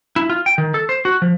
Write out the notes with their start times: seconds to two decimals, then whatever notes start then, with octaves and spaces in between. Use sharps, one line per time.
0.16 E4
0.30 F4
0.46 G5
0.58 D#3
0.74 A4
0.89 C5
1.05 F#4
1.22 F3